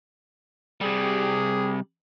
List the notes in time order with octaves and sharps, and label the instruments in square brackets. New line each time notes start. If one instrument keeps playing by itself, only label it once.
[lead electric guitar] C3 G3 [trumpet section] G4 G#4